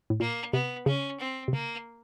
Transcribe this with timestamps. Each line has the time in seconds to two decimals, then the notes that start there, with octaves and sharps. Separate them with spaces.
0.10 A2
0.20 A#2 A#3
0.53 C3 B3
0.86 C#3 C#4
1.20 C4
1.48 C3
1.53 C#3 A#3